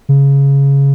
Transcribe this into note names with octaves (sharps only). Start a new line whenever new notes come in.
C#3